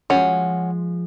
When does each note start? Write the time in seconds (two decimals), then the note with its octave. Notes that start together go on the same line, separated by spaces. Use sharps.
0.10 F3 G#3 C#4 F#4